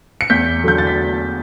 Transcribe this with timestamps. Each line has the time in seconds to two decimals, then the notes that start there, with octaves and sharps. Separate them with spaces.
0.21 C#7
0.30 E2 G6 B6
0.64 D3 F#3 G6
0.78 A6
0.87 B6